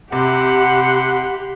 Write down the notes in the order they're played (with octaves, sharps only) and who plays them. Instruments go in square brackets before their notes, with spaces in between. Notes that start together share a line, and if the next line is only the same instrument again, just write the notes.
[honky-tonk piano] C3 [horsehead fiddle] G4 [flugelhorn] F#5 [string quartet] B5 C6 F#6